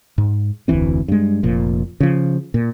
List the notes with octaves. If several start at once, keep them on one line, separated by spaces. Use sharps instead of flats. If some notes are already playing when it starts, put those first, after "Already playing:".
G#2
F1 D2 E3 C4
G2 G#3
F1 A#2 F3
C#3 F3
A#2